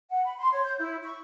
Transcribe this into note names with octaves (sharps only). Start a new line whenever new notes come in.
F#5
B5
C6
C#5
G6
E4
C#6